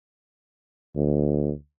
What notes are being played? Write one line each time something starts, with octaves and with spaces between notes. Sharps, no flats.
D2